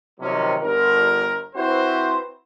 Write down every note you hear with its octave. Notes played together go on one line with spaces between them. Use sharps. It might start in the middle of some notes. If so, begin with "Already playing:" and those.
C3 D#3 F3 F#3 A#3 C#4
G1 A#4
C4 E4 F#4 B4 C5